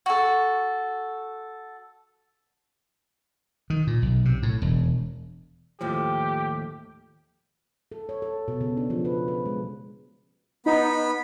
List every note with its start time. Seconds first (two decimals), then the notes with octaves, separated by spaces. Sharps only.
0.06 F#4 A4
3.70 D#3
3.87 A#2
4.02 B1
4.25 C3
4.43 A2
4.62 E1
5.81 D#2 A2 F3 G4
7.92 A4
8.09 C#5
8.22 A4
8.48 B2
8.61 C#3
8.77 D4
8.90 F3
9.05 B4
9.28 B4
9.46 G#3
10.66 B3 D#4 B5